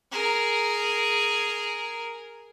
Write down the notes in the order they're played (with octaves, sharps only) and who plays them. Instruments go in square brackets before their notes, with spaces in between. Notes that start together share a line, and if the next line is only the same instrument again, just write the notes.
[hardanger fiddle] G#4 A#4